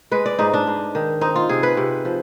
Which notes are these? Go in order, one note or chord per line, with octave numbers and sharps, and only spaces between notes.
G#3 B4
D5
G#2 D#4
D4
G#2
D#3
C4 D#4
F4
C3 G#4
B4
C3
F3